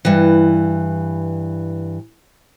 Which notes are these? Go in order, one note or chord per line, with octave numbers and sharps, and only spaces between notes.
G2 E3